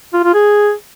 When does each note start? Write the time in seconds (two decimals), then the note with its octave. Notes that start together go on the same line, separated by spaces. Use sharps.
0.13 F4
0.24 F4
0.34 G#4